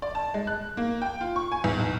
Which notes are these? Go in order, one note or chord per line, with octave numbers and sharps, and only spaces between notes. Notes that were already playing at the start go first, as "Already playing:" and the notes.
D5
A5
G#3
F#6
A#3
G5
F4
C#6
G#5
E2
B1